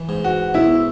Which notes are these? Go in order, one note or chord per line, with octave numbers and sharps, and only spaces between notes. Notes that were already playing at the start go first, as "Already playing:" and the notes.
Already playing: E3
G#2
F#4
B1 E4